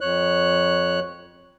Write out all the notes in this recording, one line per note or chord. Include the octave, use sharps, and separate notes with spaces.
F2 C#5 F#6